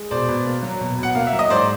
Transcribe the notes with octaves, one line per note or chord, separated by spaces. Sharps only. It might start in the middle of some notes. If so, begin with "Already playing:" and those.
Already playing: G#3
B2 C5 D5
B2
A#3
F#3
B2
B2
F#5
A#3 F5
E5
F#3
D#5
G#2 C5 D5